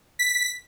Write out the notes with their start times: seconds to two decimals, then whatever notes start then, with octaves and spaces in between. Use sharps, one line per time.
0.19 B6